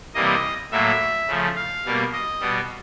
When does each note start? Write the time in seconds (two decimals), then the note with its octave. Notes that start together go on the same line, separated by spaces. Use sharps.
0.15 C3 E3 G3 A#3 D#5
0.71 A2 F#3 A#3 E5
1.27 C#3 F3 A3
1.56 F5
1.85 B2 G3 A#3
2.13 D#5
2.40 B2 G3 B3